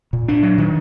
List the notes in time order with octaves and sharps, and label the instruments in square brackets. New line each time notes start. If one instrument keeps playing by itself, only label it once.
[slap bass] A#2
D4
F#3
D#3